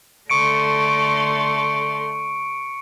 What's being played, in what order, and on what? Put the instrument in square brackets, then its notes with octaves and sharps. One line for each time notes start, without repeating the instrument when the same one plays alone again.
[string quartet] D3 A3 C6 [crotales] C#6 C#7 D7